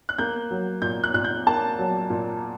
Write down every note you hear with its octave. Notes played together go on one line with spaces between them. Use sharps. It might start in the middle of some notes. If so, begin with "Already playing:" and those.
F#6
A#3 G6
F#3
A#2 G6
F#6
A#2 F#6
G6
A#3 A5
F#3
A#2